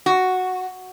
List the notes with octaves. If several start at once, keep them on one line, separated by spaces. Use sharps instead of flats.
F#4